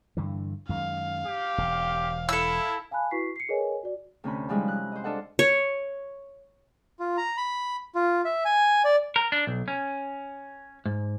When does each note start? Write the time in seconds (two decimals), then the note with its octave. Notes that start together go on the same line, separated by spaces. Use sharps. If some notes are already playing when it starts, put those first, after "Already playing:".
0.17 G2 D3 E3
0.69 F#2 D#3 G#3 F5
1.25 G4
1.58 E1
2.29 E4 A4 E6
2.91 F5 G#5 A5 B5 F#6
3.11 E4 F#4 B4 C#6 B6 C7
3.36 C7 C#7
3.49 G#4 A#4 B4 C#5 D#5 G#5
3.83 F#4 D5
4.24 D2 C3 C#4 B5
4.49 F3 G3 G#3 D#4 E4
4.68 F#6
4.92 C5 D#5
5.04 D4 F4 A4 D#5 F#5
5.39 C#5
7.00 F4
7.17 A#5
7.37 B5
7.95 F4
8.25 E5
8.45 G#5
8.85 D5
9.16 A#4
9.32 D4
9.47 B1
9.68 C#4
10.86 G#2